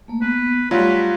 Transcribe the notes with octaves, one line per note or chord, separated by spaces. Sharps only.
A3 A#3
B3 B4
F#3 G3 A3 F4 B4 C#5